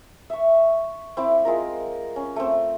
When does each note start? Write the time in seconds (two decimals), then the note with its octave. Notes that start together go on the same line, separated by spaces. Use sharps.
0.30 E5 C#6
1.17 C4 E4 D6
1.45 G#3 F4 A#4
2.16 C#4
2.36 A3 C4